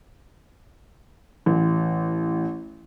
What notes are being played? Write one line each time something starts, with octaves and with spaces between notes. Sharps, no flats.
A1